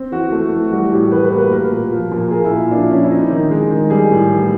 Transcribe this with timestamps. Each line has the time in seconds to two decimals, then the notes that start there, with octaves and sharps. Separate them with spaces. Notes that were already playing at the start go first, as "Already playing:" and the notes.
Already playing: C4
0.12 E3 F#4
0.32 A3
0.52 E3
0.72 G3 F#4
0.92 A2 G4
1.12 E3 B4
1.25 B4
1.32 A#3
1.38 B4
1.52 A#3 A#4
1.71 A#2
1.92 F3
2.11 A#2
2.31 A#3 G#4
2.44 E4
2.51 A#2
2.71 F3 D4
2.91 C#4
3.04 E4
3.11 C4 D#4
3.30 D#3
3.51 G#3
3.71 D#3
3.90 G3 G#4
4.11 A2
4.30 E3